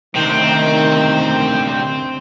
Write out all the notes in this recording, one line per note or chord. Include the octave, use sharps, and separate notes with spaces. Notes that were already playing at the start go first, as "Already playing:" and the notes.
D2 C3 D#3 C4 G5